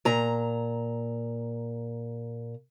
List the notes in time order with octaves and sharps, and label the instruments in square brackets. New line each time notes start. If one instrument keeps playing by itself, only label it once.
[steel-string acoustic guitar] A#2 A#5